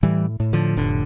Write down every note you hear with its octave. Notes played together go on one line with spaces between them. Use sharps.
A2 E3 G3
A2
D3 F3
F1 D3